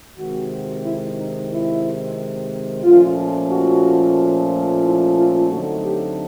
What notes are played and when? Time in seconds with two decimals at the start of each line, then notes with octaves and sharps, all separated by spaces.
0.18 C3 D#3 G#3 C4 F#4
0.85 E4
1.18 D#4
1.51 E4
2.84 A#2 F3 A3 C#4 F4
3.51 F#4
4.84 E4
5.17 F4
5.50 D3 F#3 A3 C4 D#4 F#4
5.84 G4